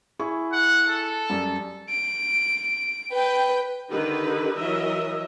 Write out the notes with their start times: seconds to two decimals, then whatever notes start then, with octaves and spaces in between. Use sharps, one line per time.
0.19 E4 G#4 C#6
0.53 F#5
0.88 A4
1.30 F#2 G3
1.90 D7
3.13 B4 G5
3.90 D3 D#3 D#4 G4 B4
4.58 E3 F#3 A#4 D#5 E5